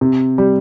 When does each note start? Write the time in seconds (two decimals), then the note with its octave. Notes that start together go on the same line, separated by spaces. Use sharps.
0.01 C3
0.38 G3